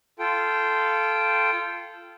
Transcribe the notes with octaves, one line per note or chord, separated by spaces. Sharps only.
F4 A4 G5